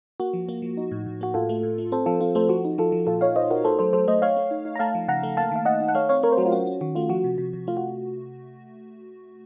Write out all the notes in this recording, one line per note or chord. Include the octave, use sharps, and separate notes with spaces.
A#3 F#4
F3
A#3
F3
D#4
A2
A2
A#3 F#4
A2 F4 A4
A3
A2
A3
C4 A4 C5
F3 F4 A4
C4 F4
A3 A4 C5
F3 F#4
D#4
F3 F4 A4
F3
A#2 F4 A4
D#4 C#5 F5
D#4 C5 D#5
D#4 F#4 A#4
A3 A4 C5
F#3 A4 C5
F#3 A4 C5
A3 C5 D#5
A3 C#5 F5
A3
D#4
D#4
A#5
A3 F5 A5
F3
C#3 F#5 A#5
A3
A#3 F5 A5
D#3 F5
D#4 D#5 F#5
D#4
F#5
A3 C#5 F5
C4 C#5 F5
A3 A#4 C#5
C5
F#3 F#4 A#4
F4
C#4 F#4
C#4
D#3 F#4
A3 F4
F3 F#4
C3
C3
C3
A3 F4
F#4